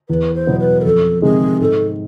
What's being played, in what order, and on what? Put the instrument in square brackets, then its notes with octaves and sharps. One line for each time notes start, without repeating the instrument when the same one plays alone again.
[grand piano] E2 [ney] B4
[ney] C5
[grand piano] B2 F#3 B3 E4
[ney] B4
A#4
[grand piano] F2 [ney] A4
[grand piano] C3 D#3 G#3 [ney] G#4
[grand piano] G#2 [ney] A4